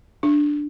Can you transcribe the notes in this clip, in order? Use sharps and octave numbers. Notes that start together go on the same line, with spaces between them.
D4